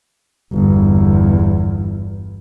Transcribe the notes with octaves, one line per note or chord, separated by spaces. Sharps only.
G1 E2